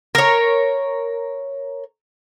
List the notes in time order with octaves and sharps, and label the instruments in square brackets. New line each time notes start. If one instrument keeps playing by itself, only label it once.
[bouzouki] A#4 C#5